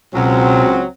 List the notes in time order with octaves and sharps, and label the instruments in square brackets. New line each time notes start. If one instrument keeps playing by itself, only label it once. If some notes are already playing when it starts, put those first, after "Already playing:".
[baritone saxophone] C#2 [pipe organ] B2 [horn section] F#3 [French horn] C4